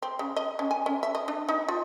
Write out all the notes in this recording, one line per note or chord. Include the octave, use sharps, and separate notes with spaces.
C4
C#3
D#5
C#4
G#5
C#4
E5
D#5
D4
D#4
F4